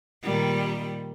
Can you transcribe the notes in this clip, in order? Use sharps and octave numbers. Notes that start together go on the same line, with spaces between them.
A#2 D#3 G3